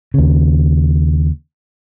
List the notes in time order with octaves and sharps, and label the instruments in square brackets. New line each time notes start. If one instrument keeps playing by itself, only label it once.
[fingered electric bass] D#2 C#3